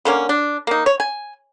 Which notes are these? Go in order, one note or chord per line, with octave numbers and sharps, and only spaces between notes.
D3 A#3 C#4
D4
A#3 D#4
C#5
G#5